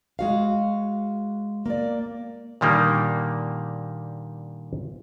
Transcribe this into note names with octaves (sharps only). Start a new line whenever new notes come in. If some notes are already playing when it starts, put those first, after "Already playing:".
G#3 F#4 F5
A#3 D5
A#2 D3 D#3 G3 A#3